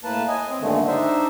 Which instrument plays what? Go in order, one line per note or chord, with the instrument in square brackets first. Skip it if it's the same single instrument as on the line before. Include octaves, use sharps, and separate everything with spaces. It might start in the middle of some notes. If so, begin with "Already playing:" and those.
[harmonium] A2 A#3 B4 A5
D#5 G#5
C4
G2 A#2 D3 D#3 G#3 A3
D4 D#4 C5 E5